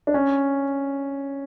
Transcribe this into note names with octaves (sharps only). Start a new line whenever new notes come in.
D4
C#4